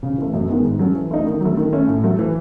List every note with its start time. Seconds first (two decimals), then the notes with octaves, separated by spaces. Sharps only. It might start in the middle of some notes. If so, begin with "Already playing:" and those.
0.03 C#3
0.18 E3 A3
0.34 F#2
0.48 D#3 G#3 B3
0.65 G#2
0.79 F#3 C#4 F#4 A4
0.95 E3
1.11 A3 D#4
1.27 D#3
1.41 F#3 A3
1.57 D#3
1.73 A3 C#4
1.87 A2
2.04 F#3 A3
2.19 E3